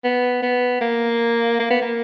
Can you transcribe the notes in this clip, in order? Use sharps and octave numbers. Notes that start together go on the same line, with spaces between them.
B3
B3
A#3
A#3
B3
A#3